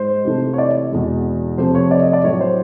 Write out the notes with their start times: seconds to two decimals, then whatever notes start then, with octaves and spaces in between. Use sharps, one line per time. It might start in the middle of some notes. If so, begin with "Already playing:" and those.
Already playing: G#2 G#3 C5
0.25 C3 E3 A3
0.54 C#5
0.58 D5
0.92 E2 B2 G#3
1.58 F2 C3 F3 A3 C5
1.75 C#5
1.91 D5
2.03 D#5
2.13 D5
2.24 A2 F#3 A3 C#5
2.41 C5